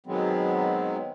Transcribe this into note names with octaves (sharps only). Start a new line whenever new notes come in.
B2 D#3 F#3 G#3 B3 C4